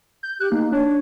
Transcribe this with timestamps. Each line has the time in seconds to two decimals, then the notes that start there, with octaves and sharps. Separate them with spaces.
0.23 G6
0.40 G4 F#6
0.52 A#3 D#4
0.72 D4 C#5